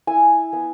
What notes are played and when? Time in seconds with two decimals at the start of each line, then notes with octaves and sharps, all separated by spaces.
0.07 E4 G#5
0.53 B3